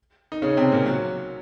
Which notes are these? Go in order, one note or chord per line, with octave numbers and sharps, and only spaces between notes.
D#4
C#3 C#4
C3 C4
A#2 A#3
F#3